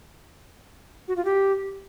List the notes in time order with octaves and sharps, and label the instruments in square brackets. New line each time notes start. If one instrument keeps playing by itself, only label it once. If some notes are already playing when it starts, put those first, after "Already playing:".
[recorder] F#4
F4
G4